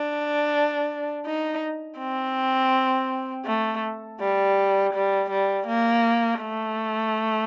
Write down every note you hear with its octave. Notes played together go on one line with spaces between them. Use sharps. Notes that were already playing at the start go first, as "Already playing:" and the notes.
Already playing: D4
D#4
C4
A3
G3
G3
G3
A#3
A3